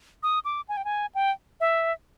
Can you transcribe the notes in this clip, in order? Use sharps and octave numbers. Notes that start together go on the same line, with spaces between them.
D#6
D6
G#5
G5
G#5
G5
E5